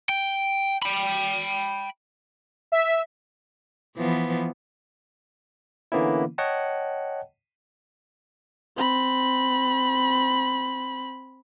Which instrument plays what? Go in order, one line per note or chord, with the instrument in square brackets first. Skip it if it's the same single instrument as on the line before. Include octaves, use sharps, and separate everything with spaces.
[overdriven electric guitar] G5
G5 B5
[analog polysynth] E5
[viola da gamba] E3 F3 B3
[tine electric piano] D3 E3 A#3 B3 C#4 E4
C#5 D#5 F#5 G5 A5
[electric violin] C4 B5